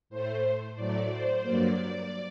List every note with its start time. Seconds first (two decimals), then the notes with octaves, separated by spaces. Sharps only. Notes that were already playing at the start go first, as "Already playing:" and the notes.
0.10 A2 A3 C5
0.76 A2 F#3 A3 D5
1.11 C5
1.43 G2 F#3 A#3 D5